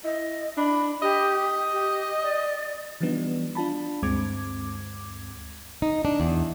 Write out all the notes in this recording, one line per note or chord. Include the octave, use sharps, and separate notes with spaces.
E4 D#5
D4 B5
G4 D#5
G4
D5
E3 F3 G3 B3 D4 D#4
D4 F4 A5 B5
D2 G2 G#3 C4 D6 G#6
D#4
D4
E2